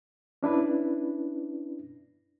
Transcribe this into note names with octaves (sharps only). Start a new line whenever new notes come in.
C#4 D4 E4 B4